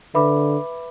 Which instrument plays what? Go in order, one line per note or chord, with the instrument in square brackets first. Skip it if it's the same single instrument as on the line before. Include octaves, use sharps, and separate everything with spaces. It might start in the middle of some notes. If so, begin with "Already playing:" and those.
[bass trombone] D3 [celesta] B4 E5 B5 D6